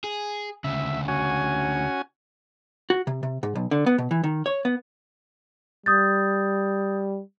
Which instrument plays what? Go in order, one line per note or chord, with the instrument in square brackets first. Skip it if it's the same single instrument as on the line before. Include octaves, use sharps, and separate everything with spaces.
[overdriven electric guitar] G#4
[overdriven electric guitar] D2 C#3 [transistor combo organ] E5
[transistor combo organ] C#4 F#4 G#5
[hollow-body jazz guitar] F#4
C3
C3
G#2
B1
D3
B3
B2
E3
D#3
C#5
B3
[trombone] G3 [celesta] D#6 G6 A6